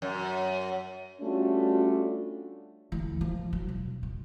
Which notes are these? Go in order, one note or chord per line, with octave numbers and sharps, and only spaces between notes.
F#2
G3 A3 C#4 D4 F4 F#4
D2 E3
F3
F#3
E1
D#3